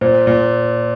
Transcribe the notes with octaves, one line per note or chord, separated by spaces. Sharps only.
A#2 C5
A#2